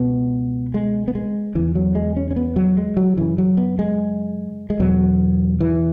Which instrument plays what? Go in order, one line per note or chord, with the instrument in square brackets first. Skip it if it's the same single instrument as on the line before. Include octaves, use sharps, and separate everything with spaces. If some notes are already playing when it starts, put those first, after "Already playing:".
Already playing: [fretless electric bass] C#2 B2 B3
G#3
B3
G#3
E2 C#3 E3
F#3
G#3
C#4
C#4
B3
F#3
G#3
F#3
F#2 C#3 E3
F#3
B3
G#3
G#3
E2 B2 F#3
E3